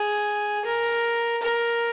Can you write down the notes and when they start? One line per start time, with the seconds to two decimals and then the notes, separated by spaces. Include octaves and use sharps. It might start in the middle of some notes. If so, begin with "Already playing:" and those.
Already playing: G#4
0.65 A#4
1.43 A#4